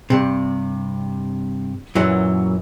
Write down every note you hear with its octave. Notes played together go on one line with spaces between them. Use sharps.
G2 C3
F#2 A#2 E3 F#3